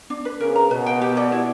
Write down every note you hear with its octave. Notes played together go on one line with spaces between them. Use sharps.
D4
B4
C#3 A#4
A#5
B2 B4
G5
G4
D5
E4